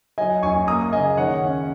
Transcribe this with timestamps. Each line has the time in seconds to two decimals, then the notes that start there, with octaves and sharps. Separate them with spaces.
0.18 F#3 D#5 G#5
0.43 F#2 G#5 C#6
0.67 A#3 A#5 D#6
0.92 C#3 D#5 G#5
1.17 D#3 C#5 F#5
1.42 C#4